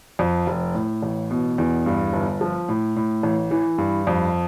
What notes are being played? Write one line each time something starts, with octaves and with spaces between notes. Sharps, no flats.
F2
F1
A2
A1
B2
E2
G2
G1
F3
A2
A2
A1
E3
G2
F2